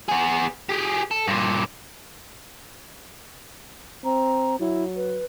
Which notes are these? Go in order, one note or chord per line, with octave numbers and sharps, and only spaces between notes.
B3 G#4
G4 G#4
A4
G2 A#2
C4 A#5
F#3 E4
B4